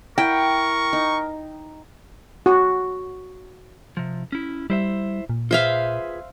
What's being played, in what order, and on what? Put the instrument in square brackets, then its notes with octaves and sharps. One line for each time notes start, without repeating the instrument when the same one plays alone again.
[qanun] E4 [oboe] A#4 [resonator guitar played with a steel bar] G5 [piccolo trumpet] C#6
[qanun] D#4
[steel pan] F#4
[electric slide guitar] C3 F3
C#4 E4
[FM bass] G3 [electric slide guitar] E4 C5 E5
[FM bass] A#2
[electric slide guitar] F4 G#4 B4 [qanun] C5 E5 F5